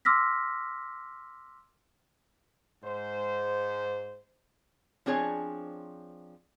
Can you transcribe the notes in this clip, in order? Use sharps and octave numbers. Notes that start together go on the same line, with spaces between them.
C6 D6 E6 F6 A#6 B6
G#2 C5
F3 C4 D4 G#4 C#5 G#5